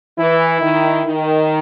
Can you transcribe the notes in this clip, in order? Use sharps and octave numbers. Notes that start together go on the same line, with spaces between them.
E3 E4
D#3
D#3